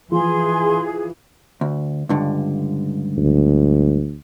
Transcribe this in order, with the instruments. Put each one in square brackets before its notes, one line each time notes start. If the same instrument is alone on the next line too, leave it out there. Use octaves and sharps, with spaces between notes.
[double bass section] E3 [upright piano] F3 [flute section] G#4 [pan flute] C6
[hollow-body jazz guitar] D2
C#2 G2 D3
[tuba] D2